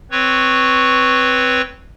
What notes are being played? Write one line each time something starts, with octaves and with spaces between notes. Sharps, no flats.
C4 B4 C#5 C#6